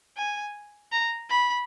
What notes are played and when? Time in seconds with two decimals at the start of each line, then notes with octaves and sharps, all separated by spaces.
0.17 G#5
0.92 A#5
1.30 B5